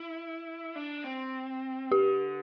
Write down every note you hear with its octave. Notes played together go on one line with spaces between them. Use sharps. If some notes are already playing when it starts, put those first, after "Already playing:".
Already playing: E4
D4
C4
D3 G4